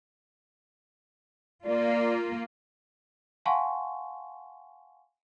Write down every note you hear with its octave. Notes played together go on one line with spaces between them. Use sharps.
A#3 F4 D5
F5 F#5 G#5 A5 C6 C#6